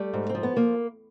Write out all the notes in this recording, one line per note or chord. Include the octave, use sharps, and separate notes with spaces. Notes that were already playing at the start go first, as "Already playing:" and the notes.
Already playing: G3 A3
G#2
C4
F3
B3
F3 A#3